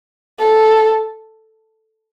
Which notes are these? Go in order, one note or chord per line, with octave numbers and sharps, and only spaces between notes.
A4